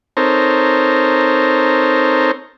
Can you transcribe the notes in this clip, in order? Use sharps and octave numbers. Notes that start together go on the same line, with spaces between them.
C4 D#4 A4 A#4 C5 C#5